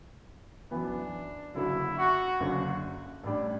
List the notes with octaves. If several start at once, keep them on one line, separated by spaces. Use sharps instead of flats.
F#2 E3 B3 D4
F#1 F#2 D3 F#3 E4
F#4
F#1 F#2 D3 F#3
A1 A2 G3 D4